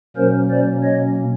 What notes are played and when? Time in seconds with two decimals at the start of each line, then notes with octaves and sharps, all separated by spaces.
0.16 B2 F#3 A#3 C#4 A#4 C5
0.50 C5 D5
0.83 C#5 D#5